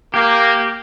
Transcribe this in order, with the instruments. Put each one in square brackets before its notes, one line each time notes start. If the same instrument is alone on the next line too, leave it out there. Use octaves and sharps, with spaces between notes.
[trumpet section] A#3 [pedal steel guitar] G4